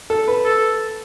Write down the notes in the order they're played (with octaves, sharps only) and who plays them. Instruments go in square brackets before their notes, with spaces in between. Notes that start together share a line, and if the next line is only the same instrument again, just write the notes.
[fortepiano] A4
B4
[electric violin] A4